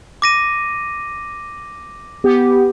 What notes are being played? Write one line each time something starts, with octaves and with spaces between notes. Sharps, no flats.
D6 A#6 D#7
B3 G4